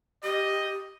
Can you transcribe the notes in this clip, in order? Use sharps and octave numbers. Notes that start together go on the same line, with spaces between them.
G4 D#5